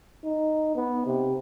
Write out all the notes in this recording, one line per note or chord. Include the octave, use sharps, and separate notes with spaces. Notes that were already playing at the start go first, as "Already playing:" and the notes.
D#4
B3
C3